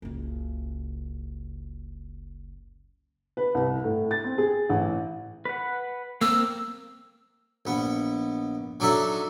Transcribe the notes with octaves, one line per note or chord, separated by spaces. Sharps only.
F#1 C#2
B4
C2
A2
A6
C4
G#4
A1
B4 F#5
A#3 C4 A#4 E6
A#1 B3
F#3 D4 D#4 A4 E5